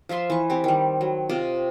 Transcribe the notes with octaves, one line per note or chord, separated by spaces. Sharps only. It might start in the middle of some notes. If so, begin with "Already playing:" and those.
F3 F4 E5 C6
E3 C#6
C4 G4
D#3 G3
F#3
C3 F4 D#5 D6